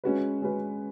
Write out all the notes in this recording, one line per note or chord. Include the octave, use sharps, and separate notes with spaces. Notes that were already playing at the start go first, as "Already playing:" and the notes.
G#3 C#4 F#4 B4
G#3 C#4 F#4 B4